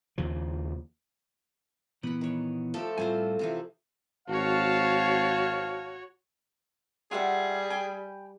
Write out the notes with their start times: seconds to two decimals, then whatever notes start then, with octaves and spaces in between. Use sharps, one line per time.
0.18 D#2 C#3 F3
2.03 A#2 E3 B3 F#5 B5
2.21 D#3 C#5
2.74 F3 A3 G4 A4
2.98 A2 G3 C4 F4 C5 G#5
3.39 C3 E3 F3
4.29 G#1 F#4 C#5 F5 A5
7.11 G3 F4 G#4 E5 F#5
7.70 G5 G#5 B5